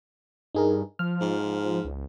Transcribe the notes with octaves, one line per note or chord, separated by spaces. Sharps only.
G2 D#4 G#4 A#4
F3 F6
G#2
C#2